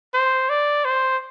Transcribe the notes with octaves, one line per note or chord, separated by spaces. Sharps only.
C5
D5
C5